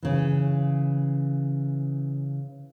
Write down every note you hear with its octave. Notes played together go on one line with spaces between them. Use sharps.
C#3 E3